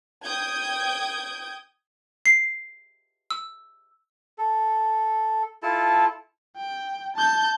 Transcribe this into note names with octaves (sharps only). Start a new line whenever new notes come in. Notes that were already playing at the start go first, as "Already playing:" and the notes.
G5 D#6 G6 G#6
C7
E6
A4
E4 F4 A4 A5
G5
A5 G6